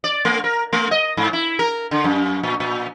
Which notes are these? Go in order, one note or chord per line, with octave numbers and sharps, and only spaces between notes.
D5
A3
A#4
A3
D#5
G#2
E4
A#4
D3
F#2
A#2
A#2